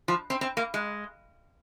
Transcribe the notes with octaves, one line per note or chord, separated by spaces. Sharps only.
F3
C4
C4
A#3
G#3